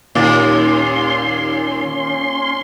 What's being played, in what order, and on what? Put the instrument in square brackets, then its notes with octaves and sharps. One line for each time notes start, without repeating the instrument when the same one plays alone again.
[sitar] D#2 [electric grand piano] A#2 D6 A6 [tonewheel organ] C#4 C6